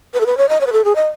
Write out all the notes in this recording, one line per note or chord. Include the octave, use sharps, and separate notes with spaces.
B4
A4
B4
C#5
D#5
C#5
B4
A4
G#4
D#5